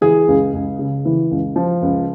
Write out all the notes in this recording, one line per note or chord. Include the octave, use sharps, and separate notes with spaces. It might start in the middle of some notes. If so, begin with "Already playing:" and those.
E3 G#4
C#2
C#2
C#3
E3
C#2
F3
C#2